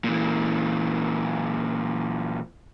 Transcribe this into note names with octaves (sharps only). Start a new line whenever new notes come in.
A#2 E3